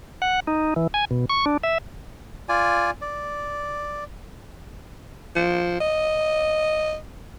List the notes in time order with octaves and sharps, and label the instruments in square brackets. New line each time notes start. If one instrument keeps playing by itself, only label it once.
[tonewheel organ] F#5
D#4
E3
G#5
B2
C#6
D4
E5
[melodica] F4 D5 G#5
D5
[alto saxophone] F3
D#5